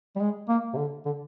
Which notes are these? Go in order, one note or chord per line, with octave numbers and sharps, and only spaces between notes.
G3
G#3
A#3
C3
D3
D3